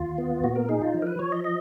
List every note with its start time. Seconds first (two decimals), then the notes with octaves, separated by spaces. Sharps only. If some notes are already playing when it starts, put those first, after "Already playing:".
Already playing: D#2 F4
0.18 B3
0.44 A#2 F#4
0.56 A#4
0.69 D#4 G#4
0.82 F4
0.94 F3
1.02 A#4
1.07 B4
1.19 F3 C#5
1.32 D#5
1.44 D#5